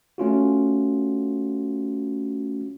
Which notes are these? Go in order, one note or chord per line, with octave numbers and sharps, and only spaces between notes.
A3 C#4 F4 F#4